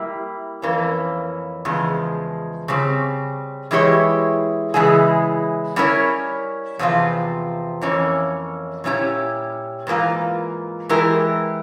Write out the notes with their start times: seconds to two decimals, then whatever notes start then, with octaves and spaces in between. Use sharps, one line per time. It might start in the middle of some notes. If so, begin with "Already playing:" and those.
Already playing: G3 A#3 E4
0.62 F2 E3 A#3 C#4
1.65 E2 C#3 F3 G#3
2.68 C#3 G3 C4
3.71 E3 G#3 E4 G4 C#5
4.74 C#3 E3 G#3 E4 G#4
5.76 G3 C#4 E4 A#4 C#5
6.79 E2 C3 F3 C4 F4
7.81 F2 E3 A#3 C#4
8.84 A#2 G3 C#4 E4 G4
9.87 G#2 E3 A#3 F4
10.89 E3 G#3 E4 G4 A#4